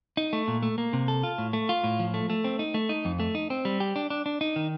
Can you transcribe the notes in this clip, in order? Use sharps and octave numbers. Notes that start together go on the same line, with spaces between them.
D#4
A3
A#2
A3
A#3
C3
A4
F4
A2
A3
F4
A2
F3
A3
A3
C4
D#4
A3
D#4
F2
A3
D#4
C4
G3
G4
D4
D4
D4
D#4
D#3